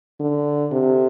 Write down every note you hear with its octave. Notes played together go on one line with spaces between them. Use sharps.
D3
C3